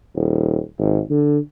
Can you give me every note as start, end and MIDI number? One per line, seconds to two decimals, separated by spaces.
0.15 0.59 27
0.79 0.99 32
1.10 1.38 50